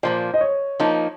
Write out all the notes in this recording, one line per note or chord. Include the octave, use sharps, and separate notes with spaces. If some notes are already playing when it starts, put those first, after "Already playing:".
A#2 F3 A#3 C5
D#5
C#5
F3 A#3 D#4